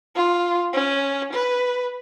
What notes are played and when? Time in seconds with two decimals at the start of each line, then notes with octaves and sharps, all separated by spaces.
0.15 F4
0.73 C#4
1.33 B4